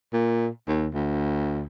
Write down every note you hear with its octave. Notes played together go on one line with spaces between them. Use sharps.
A#2
D#2
D2